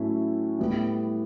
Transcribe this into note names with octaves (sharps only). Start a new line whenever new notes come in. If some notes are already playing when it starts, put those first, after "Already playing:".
Already playing: A2 F#3 A3 C#4 E4
A2 G3 B3